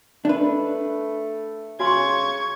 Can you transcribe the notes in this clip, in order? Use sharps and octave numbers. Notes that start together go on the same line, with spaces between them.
A3 D4 B4
C#3 F#4 G#5 C6 C#6 G#6